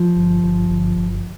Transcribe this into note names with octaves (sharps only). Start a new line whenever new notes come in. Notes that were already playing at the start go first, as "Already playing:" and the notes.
Already playing: F3
G1
G1
G1
G1